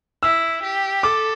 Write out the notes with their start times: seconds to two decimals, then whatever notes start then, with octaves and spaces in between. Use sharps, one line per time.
0.23 E4 E6
0.63 G4
1.03 A4 D6